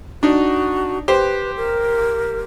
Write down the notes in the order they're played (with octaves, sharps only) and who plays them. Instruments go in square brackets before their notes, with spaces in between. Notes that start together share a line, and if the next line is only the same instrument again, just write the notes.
[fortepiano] D4 D#4 [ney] F#4
[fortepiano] G4 C5 [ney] B4
[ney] A#4